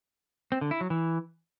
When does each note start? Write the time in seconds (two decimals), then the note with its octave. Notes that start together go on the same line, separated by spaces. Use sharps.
0.52 C4
0.61 D3
0.71 E4
0.81 F#3
0.90 E3